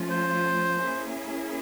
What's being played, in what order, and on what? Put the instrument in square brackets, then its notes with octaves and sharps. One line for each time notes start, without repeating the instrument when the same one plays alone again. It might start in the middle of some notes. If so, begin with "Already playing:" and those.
Already playing: [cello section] F3 A3 C#4 F4
[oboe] C5
[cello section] A#3 C#4 E4 G#4